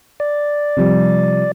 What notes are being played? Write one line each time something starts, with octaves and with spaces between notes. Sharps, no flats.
D5
C3 F3 G3